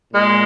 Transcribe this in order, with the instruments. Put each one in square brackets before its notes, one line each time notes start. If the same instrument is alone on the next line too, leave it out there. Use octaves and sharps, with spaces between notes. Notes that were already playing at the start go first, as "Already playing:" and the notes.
[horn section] A#2 G#3